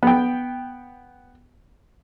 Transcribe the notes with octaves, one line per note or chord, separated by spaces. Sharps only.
B3 G5